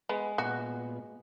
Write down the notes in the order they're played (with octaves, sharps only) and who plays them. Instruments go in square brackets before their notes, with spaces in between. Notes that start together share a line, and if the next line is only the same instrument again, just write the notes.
[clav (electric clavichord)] G#3 [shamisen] B3
[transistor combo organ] A#2 B3 [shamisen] F#4